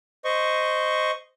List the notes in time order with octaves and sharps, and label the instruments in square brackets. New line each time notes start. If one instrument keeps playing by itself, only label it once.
[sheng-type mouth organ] C5 D#5 C#6